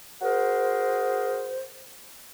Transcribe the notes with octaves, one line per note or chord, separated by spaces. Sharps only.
F#4 G#4 A#4 C5